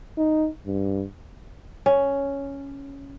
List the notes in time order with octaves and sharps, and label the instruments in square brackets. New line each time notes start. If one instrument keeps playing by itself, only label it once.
[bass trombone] D#4
G2
[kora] C#4